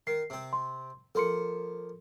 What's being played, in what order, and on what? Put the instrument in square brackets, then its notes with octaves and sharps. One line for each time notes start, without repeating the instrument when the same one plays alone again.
[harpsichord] D#3 [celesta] C7
[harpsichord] C3 C4
[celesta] C6
[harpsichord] F3 A#3 [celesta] A4 C6 C#7